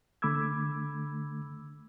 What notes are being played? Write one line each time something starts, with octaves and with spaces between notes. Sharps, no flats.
D3 A3 B5 D6 E6 G#6